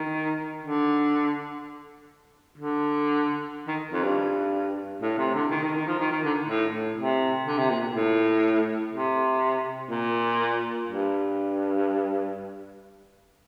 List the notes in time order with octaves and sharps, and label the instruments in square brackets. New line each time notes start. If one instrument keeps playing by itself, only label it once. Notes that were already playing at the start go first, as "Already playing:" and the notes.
Already playing: [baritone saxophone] D#3
D3
D3
D#3
F2
G2
A2
C3
D3
D#3
D#3
D#3
F3
D#3
D#3
D3
A2
A2
C3
D3
C3
A#2
A2
C3
A#2
G2